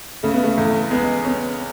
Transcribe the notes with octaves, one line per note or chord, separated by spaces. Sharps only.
C#3 A3
B3
A3
E2
G#3 B3
B3 C#4